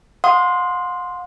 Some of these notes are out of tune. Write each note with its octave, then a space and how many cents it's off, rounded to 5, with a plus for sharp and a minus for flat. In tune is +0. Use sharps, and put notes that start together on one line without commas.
F#5 -45 C6 +0 D#6 +0